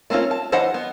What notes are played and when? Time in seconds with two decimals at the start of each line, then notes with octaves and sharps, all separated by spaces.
0.10 A3 A#3 C4 C#4 F4
0.31 A5
0.52 E3 C5 D#5 F5 F#5
0.74 B3